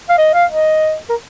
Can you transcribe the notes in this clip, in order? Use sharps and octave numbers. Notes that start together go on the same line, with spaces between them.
F5
D#5
F5
D#5
A#4